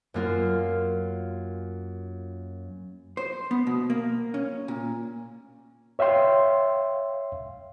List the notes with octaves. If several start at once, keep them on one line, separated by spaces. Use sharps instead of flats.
F#2 A#3 F4
C5
B3
B2
A#3
C#4
A#2
C#5 E5 F5 G5 C6